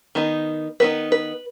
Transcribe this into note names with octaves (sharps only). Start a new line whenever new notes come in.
D#3 B3 D#4
D#3 B3 D#4 B4
B4